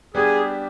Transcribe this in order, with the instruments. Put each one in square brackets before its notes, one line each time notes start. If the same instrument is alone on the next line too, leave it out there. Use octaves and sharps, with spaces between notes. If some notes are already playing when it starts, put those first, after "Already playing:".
[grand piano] G3 B3 D4 G4 [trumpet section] G#4